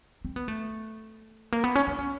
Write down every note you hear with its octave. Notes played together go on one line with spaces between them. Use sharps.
C4
B3
A3
A#3
B3
C#4
D4
C#4